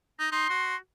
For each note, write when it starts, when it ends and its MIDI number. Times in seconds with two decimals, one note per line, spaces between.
0.19 0.30 63
0.19 0.30 94
0.32 0.49 63
0.32 0.76 84
0.49 0.76 66